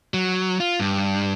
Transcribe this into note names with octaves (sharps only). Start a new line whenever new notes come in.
F#3
F4
G2